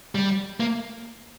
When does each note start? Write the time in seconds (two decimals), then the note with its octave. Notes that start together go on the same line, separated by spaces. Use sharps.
0.15 G3
0.60 A#3